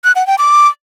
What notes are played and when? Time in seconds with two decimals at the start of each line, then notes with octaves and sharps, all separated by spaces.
0.04 F#6
0.16 F#5
0.27 G5
0.38 D6